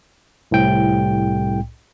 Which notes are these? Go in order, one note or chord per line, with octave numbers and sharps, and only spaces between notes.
C2 A2 G5